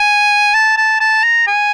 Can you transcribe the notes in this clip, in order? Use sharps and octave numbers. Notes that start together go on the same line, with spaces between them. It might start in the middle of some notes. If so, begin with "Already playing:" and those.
Already playing: G#5
A5
A5
A5
A#5
G#5